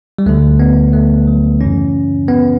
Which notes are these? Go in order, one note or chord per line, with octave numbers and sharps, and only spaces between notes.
G3
D2 D3 A3
B3
A3
F#3
F#2 C#3 E3 C#4
B3